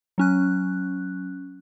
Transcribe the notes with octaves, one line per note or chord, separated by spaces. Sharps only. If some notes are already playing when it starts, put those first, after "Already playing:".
F#3 C#4 F#6